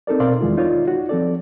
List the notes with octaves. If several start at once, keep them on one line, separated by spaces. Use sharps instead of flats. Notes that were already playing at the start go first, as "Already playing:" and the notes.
C4 D#4 A4 A#4 D5
B2 C4 A#4 D5 F5 C6
E2 D#3 E3 G#3 E4 F4
D#4 F4 C#5 D5
F#4
F3 C4 A4 D5